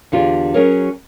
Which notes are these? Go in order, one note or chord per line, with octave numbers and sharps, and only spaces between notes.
E2 D3 F4 G4 G#4 D5
F#3 C#4 G#4 A#4 C#5